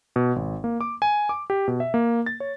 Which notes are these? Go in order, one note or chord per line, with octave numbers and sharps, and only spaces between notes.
B2
G#1
A#3
D6
G#5
D6
G4
B2
E5
A#3
A6
C#5